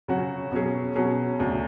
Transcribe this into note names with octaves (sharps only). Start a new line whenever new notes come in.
C#3 F#3 C#4 F#4
B2 F#3 C#4 G#4
B2 F#3 C#4 G#4
D2 C#3 F#3